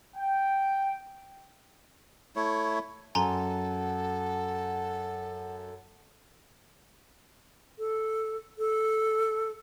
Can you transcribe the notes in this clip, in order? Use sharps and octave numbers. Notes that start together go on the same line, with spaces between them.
G5
A3 E4 C#5
F#2 A4 F#5 G#5 A#5 C6
A4
A4